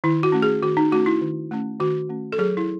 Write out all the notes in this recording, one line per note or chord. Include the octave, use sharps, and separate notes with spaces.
D#3 E4
F#4
A3 C#4
G#4
D#3 F#4
D#4
A3 C#4 F#4
E4
D#3
A3 C#4
D#3 F#4
A3 C#4
A4
F#3 G#4
E4